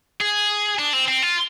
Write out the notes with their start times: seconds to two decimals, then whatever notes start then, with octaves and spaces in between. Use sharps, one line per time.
0.21 G#4
0.79 D4
0.93 C4
1.08 C4
1.22 F4